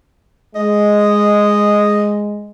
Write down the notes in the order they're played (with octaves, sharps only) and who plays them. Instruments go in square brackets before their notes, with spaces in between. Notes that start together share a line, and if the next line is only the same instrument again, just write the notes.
[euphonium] G#3 [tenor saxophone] D#5